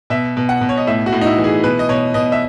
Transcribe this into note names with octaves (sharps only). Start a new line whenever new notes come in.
B2 E5
B2
F#5
B2
C#5
D#5
A2 E5
F#4
A2
D#4
E4
E3
G#4
B2 B4
D#5
B2 C#5
B2 D#5
E5